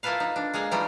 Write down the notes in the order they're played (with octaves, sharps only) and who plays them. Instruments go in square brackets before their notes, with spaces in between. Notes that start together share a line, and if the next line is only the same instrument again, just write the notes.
[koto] A#3 E4 F4 A4 B4 F5
D#4
D4
G#3 A#3 G#4 F5
E3 G3 A3 D#4 F4